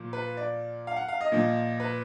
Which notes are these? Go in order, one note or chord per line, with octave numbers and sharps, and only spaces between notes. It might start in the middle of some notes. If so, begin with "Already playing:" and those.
Already playing: A#2 F3
B4
D5
F5
F#5
F5
D#5
A#2 F3
B4